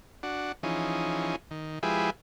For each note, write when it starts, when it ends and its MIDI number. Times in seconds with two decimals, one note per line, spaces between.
0.23 0.52 62
0.23 0.52 66
0.63 1.36 52
0.63 1.36 53
0.63 1.36 61
0.63 1.36 63
0.63 1.36 68
1.51 1.79 51
1.83 2.10 53
1.83 2.10 56
1.83 2.10 64
1.83 2.10 67
1.83 2.10 68
1.83 2.10 71